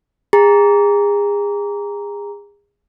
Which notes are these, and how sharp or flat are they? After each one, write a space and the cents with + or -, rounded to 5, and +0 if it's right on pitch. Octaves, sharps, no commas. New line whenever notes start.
G#4 -30 A#5 +0